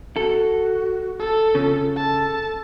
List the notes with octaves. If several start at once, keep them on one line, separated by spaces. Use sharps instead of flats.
F#4 A4
A4
C#3 F4
A4 A5